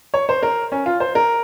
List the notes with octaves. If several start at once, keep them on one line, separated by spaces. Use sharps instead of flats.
C#5
C5
A#4
C#4
F4
C5
A#4